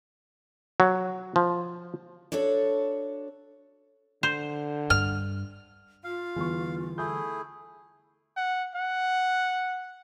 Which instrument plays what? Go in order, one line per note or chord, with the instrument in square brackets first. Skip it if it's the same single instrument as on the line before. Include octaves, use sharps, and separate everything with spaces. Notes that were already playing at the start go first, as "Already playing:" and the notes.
[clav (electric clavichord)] F#3
F3
[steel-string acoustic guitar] D4 F#4 A4 C#5
[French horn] D3 [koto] C5
[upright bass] G2 [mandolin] F6
[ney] F4 [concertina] F5
[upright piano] E2 B4 C#6 [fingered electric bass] D3 E3 G3
[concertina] A3 E4 G#4 [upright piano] G6
[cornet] F#5
F#5